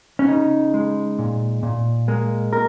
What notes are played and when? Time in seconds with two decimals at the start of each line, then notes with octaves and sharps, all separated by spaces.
0.19 C#4
0.28 C#3 D#4
0.74 G#3
1.19 A#2
1.63 A#2
2.08 G#3 A#3
2.53 A#4